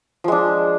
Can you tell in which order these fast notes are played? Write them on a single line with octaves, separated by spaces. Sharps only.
F3 G#3 D4